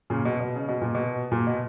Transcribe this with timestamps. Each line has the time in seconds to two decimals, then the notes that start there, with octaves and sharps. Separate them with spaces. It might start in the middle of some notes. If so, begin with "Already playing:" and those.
0.10 A#2 C#3
0.25 B2
0.41 B2
0.56 C#3
0.68 B2
0.81 A#2
0.95 B2
1.32 A#2
1.47 B2